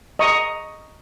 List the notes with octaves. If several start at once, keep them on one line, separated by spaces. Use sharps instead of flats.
D#5 A#5 C#6 D#6